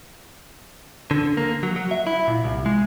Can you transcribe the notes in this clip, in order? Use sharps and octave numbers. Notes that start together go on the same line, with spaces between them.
D3
A#3
F#3
F#3
E5
E4
A#2
C2
G#3